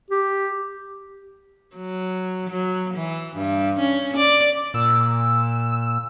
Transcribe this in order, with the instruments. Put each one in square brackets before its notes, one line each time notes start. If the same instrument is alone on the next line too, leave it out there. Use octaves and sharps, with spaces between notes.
[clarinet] G4
[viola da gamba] F#3
F#3
E3
G2
C#4
D5
[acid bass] A#2 [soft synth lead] E6